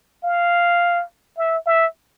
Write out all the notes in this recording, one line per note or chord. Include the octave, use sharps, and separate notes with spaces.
F5
E5
E5